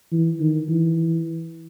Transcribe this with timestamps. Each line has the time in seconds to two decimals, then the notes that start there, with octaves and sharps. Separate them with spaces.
0.12 E3
0.40 D#3
0.69 E3